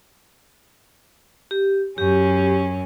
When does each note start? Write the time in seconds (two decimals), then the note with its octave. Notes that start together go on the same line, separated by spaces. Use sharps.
1.51 G4
1.98 F#2 C#4 G4